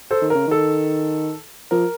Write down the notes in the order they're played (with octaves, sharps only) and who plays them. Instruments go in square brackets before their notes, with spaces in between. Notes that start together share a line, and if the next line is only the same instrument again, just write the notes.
[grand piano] A4 C5
[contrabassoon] D#3
[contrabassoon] C#3 [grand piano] A#4
[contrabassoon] D#3 [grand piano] A4
[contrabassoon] F3 [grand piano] A#4